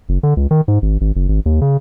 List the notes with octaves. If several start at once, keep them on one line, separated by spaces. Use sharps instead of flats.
F#1
D3
C#2
D#3
G#2
G#1
G#1
F#1
G#1
D#2
C#3